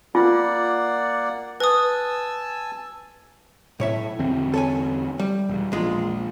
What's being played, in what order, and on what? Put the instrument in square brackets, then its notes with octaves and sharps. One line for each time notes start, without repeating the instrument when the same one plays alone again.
[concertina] A#3 D5 F#5 [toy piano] F4
[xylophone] B4 D#6 [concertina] G#5 A5 E6
[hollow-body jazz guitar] B1 C#5 E5 [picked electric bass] A2
[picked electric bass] E2 D3 C4
[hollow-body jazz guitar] A4 C#5 G#5
G3
[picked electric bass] E1
[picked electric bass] A#1 [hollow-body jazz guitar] E2 G#3 F4